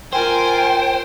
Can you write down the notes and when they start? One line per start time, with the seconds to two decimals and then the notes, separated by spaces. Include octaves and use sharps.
0.13 F4 A#4 C5 G5 G#5